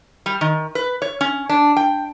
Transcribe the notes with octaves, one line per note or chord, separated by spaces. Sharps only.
G3
D#3
B4
C#5
C#4
D4
G5